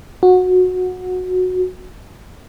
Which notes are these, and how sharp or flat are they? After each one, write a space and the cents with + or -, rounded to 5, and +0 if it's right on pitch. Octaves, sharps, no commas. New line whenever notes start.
F#4 -15